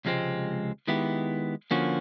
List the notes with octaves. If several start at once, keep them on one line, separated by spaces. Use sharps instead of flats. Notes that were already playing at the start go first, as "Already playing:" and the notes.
C#2 C3 F3 G#3 C4
D#3 G#3 B3 E4 G4
D3 F3 A#3 C#4 F#4